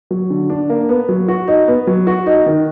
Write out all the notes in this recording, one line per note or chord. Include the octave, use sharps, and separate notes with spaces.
F#3
D3
D4
A#3
B3
F#3
F#4
D#4
B3
F#3
F#4
D#4
D#3